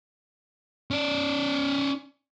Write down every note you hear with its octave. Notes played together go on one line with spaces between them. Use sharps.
C#4 D5